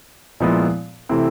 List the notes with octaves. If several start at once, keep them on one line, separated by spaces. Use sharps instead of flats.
A#2 F3 G#3 B3 E4
C3 E3 A3 C4 E4